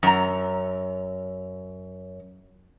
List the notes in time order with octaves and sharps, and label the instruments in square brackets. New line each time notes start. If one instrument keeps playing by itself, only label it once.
[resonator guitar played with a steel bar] F#2 A#5